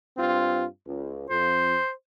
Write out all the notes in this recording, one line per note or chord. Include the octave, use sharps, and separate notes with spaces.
G2 C4 F4
C#2
F2 C5